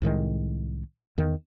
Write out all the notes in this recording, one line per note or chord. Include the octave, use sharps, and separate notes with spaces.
C2 A2 D#3 G#3
E2 D#3